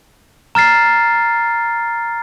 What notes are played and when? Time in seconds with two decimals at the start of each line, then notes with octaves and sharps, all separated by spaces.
0.55 A#5 F6 A6 C7